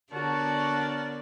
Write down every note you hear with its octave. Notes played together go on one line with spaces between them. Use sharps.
D3 B3 F#4 A#4 C#5 D5 A5